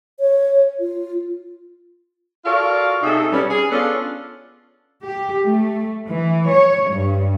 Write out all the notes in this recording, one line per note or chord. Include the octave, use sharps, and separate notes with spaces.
C#5
F4
F4 F#4 A4 A#4 D5 F5
C3 D#4 G#4 A4 E5
B2 G3 B3 C#4
G#4
B3 C#4 D4 F4 A4
G4
A3
E3
C#5
G2